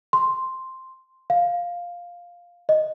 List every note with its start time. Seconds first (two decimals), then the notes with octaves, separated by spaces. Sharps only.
0.13 C6
1.30 F5
2.69 D#5